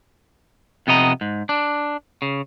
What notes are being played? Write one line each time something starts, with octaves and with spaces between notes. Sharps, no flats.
F2 C3 B3 D#5 A#5
G#2
D4
C#3